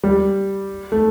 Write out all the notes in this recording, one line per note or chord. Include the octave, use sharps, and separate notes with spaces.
G3
A3